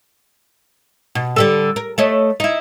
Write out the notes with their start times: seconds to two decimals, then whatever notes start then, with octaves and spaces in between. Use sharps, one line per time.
1.15 B2
1.36 D3 G3 A4
1.76 A#4
1.98 A3 C#5 D#5
2.40 D#4 E4